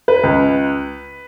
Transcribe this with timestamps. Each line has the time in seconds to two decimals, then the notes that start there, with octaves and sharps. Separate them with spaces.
0.08 B4
0.23 C#2